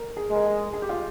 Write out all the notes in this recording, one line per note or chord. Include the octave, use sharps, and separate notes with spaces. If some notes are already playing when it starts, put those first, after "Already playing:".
Already playing: A#4
G#4
G#3 A#4
G#4
G#4
G4
F4